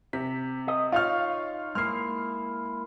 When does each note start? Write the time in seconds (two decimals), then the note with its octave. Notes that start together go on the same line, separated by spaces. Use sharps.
0.13 C3 B6
0.68 D#5
0.92 D#4 F4 C#5 F5 F6
1.75 G#3 A#3 E4 F6 C7